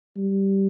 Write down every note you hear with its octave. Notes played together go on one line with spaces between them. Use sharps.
G3